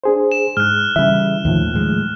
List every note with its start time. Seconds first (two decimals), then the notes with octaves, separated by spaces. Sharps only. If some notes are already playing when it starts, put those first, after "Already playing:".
0.04 D4 G#4 C5
0.32 E7
0.57 G#2 F6 F#6
0.96 C#3 E3 G3 E5
1.45 D#2 A2 D#3 F3
1.73 A2 G#3